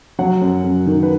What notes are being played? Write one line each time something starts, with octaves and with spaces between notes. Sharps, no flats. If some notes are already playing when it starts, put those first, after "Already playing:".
F#3 F#5
F#2
F#2
D#3
B4